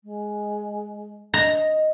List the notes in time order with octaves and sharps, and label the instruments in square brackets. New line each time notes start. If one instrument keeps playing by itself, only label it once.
[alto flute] G#3
[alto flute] D#5 [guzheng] A#5